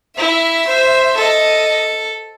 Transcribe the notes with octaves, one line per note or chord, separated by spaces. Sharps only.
E4 E5
C5
A4 D#5